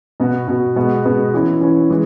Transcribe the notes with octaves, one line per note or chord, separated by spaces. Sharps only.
B2 B3 F#4
B2 B3 F#4
B2 G#3 B3 F#4
B2 G#3 B3 F#4
E3 C#4 E4
E3 C#4 E4
E3 G#3